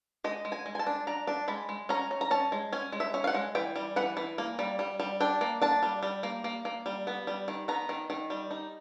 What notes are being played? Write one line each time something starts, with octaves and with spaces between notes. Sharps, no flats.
G#3 D#5
G#3
G#5
G#3
G#5
A5
D4
D4 A#5
D4
G#3 B5
G#3
C#4 A#5
C#4
A#5
C#4 A5
G#3
C#4 G#5
G#3
E5
C#4
F5
F#5
G#3
E3 G5
G3
E3 F#5
E3
A#3
G3
G3
G3
D4 G5
A#3
D4 A5
G3
G3
A#3
A#3
A#3
G3
B3
G3
D#3
B3 A#5
D#3
D#3
G3
D#4